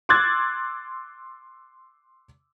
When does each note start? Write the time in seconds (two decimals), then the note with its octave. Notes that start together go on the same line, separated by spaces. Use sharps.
0.09 C6 D6 E6 F#6 G#6 A6